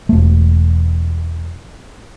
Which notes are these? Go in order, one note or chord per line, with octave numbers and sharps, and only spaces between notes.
E1 A3